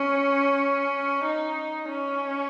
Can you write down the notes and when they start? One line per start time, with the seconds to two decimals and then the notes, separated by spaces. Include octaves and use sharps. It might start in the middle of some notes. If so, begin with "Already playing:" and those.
Already playing: C#4
1.25 D#4
1.89 C#4